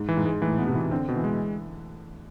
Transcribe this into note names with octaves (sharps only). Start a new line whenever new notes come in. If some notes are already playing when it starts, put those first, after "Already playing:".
Already playing: G#2
E3
G#2
G#3
A2 E3
B2 B3
C3
E3
D3 C4
B2
E3
G#3